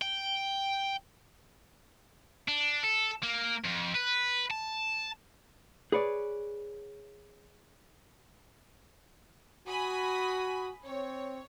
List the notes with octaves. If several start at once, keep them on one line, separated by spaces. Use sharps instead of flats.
G5
D4
A4
A#3
F2
B4
A5
G#4 B4 C#5 D5
F#4 G#5 B5 D#6
C4 C#5